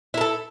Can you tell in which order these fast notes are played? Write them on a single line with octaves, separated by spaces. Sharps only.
E4 A#4 A4